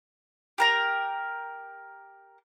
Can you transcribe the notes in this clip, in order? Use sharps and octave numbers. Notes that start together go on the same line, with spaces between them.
G4 A#4 A#5